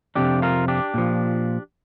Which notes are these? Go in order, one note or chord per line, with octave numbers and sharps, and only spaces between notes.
F2 C3 F3 D4 G4
F4 A#4
D4 G4
A#2 F3